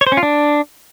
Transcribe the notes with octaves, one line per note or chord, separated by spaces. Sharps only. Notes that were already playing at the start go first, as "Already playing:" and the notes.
C#5
C5
C#4
F4
D4